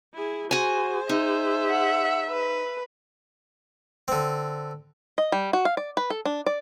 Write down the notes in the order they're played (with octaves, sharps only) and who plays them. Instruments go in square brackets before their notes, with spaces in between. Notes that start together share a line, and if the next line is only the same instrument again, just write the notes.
[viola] E4 G#4
[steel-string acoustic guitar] F#4 G#5 [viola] G#4 C5
[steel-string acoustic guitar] D#4 [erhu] E5
[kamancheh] F#5
B4
[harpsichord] D3 C4
[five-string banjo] D#5
G3
F#4
F5
D5
B4
A4
D4
D5